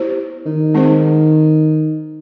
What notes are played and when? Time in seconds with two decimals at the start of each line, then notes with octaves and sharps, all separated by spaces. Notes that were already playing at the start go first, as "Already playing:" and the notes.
Already playing: B3 E4 G4 C5
0.46 D#3
0.74 G#3 C4 D#4 G#4 C5